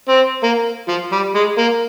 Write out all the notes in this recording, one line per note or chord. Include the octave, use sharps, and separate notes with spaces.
C4
A#3
F3
G3
G#3
A#3